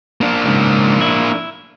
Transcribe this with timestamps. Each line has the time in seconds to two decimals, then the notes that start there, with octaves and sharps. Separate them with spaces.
0.21 A#3 D4
0.46 C#2 G#2
1.01 E4